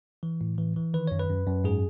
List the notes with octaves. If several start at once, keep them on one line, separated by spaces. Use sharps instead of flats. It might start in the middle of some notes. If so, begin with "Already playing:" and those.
E3
A2
E3
E3
D#3 B4
F#2 C#5
B4
F#2
F#2
G#2 G#4